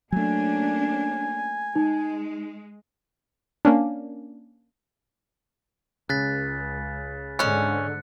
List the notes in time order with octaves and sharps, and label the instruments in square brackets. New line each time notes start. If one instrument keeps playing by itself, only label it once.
[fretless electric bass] F#3 A3 [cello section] A#3 C#4 D4 [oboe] G#5
[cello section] G#3 [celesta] D#4
[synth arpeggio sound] A#3 C#4 D4
[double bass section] C#2 [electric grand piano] C#3 [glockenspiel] F#6 A6 B6
[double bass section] G#2 D3 [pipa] G#3 C#4 [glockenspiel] F#6 C#7